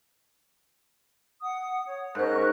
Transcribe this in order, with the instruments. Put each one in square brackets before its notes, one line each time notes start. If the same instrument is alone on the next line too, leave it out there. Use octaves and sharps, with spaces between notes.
[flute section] F#5 D#6
C#5
[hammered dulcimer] G#2 C#4 [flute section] A#4 D#5 F#6
[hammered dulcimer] C#6